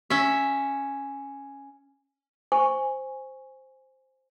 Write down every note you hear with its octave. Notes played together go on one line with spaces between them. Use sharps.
C#4 E5
C5 G#5 C#6